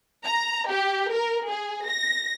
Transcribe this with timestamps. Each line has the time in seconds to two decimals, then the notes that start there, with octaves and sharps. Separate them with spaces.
0.25 A#5
0.69 G4
1.12 A#4
1.50 G#4
1.87 A#6